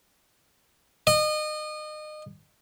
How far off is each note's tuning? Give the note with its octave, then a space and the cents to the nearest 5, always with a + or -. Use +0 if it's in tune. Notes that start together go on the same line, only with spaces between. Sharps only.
D#5 -30